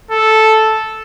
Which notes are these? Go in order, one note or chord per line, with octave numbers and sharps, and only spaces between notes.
A4